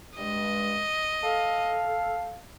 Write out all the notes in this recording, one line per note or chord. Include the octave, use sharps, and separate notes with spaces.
G2 G#3 D#5
A4 F5